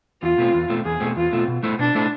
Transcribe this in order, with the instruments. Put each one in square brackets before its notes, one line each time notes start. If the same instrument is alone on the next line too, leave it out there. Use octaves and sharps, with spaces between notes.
[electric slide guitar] E2 [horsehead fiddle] F4
[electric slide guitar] B2 A3 C4
E2
B2 A3 C4
[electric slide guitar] E2 [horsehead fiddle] G#4
[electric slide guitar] B2 A3 C4
[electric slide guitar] E2 [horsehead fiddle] F4
[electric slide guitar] B2 A3 C4
B2
A3 E4 A4 C5
[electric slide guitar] B2 [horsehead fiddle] D4
[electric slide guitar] A3 E4 A4 C5